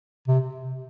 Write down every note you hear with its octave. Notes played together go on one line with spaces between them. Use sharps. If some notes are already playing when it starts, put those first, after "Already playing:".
C3